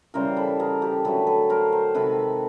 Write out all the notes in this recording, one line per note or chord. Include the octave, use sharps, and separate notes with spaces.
C#3 E3 G3 A#4 C5
A4 B4
G#4 A#4
G4 A4
D3 F#3 A3 A4 B4
A4 B4
A#4 C5
A#4 C5
C3 D#3 G#3 A4 B4